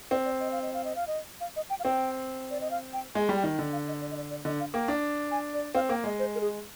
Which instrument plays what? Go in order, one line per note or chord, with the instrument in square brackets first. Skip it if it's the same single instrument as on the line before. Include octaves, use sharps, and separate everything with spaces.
[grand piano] C4 [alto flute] D5
[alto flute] D5
D#5
F5
D#5
F5
D#5
F5
D#5
F5
D#5
G5
F5
[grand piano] C4 [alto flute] G5
[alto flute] D5
D#5
F5
G5
[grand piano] G#3 [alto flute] G#5
[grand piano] G3
[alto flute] G5
[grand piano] D#3
D3
[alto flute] F5
D#5
D5
D#5
D5
D5
[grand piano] D3 [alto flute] D#5
[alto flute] F5
[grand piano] A#3 [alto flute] G5
[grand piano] D4
[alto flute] G#5
D5
[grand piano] C4 [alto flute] F5
[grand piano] A#3 [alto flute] G5
[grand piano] G#3 [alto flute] D#5
[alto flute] C5
A#4
G#4